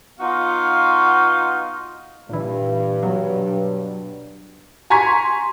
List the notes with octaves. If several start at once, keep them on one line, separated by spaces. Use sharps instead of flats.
B3 D#4 F4 F#4 F5
G2 A#2 E3
B2 F#3
G#5 A#5 C6 C#6 G#6 B6